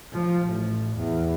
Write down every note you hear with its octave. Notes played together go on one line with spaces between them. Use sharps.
F3
A1
E2